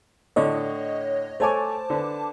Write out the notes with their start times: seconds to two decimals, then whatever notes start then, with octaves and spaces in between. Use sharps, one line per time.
0.36 A2 D3 C#5 D#5
1.40 A3 C5 C#5 G#5 A5 D6
1.90 D3 B4